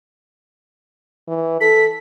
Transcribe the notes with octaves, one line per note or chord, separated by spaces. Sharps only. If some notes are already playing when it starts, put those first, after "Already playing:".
E3
A4 B6